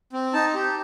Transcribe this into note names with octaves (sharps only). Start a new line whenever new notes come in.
C4
D#4 A5
G4